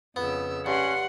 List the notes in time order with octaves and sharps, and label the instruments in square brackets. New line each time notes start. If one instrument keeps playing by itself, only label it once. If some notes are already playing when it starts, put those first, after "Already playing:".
[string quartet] F2 C#3 E6 [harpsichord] B3
[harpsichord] G2 [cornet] C#4 [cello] F#5 [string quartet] C6 F#6